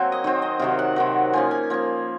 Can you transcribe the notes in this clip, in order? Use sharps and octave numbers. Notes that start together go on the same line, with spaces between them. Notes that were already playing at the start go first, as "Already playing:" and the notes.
Already playing: F#3 A#3 C4 G#5 A#5
D#5
D#3 F#3 C4 C#5
D#5
C3 D#3 F#3 F5
F#5
C3 D#3 F#3
F3 A#3 C#4 G#5
G#5
F3 A#3 C#4